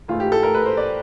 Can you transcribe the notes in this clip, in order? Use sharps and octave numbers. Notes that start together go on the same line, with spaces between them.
G#2 E3 A3 F4
G4
A4
A#4
B4
C5
D5